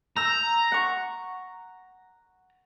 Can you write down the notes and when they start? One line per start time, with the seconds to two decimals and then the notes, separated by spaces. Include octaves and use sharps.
0.16 A#5 E6 G6
0.72 F#5 C#6